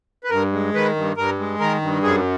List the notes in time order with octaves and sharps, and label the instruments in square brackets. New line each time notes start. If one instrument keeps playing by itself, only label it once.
[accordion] B4
G2 A#4
G#3
D#3 B4
G2
G2 A#4
G#3
D#3 A#4
G2
F#2 G#4